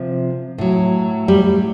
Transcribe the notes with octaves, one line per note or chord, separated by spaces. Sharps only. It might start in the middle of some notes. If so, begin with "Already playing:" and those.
Already playing: C3 F3
A2 F#3
G3